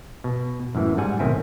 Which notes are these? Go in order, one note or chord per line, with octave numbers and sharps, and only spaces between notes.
B2
F#2 A2 E3
G#2 G3 F#5 G#5
B1 A2 D#3 C4 E4 G#5